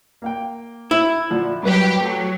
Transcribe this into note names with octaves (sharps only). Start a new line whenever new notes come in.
A#3 F5 G5
E4
A#2 D3 F3
G2 F#3 G4 B4
F#3 A3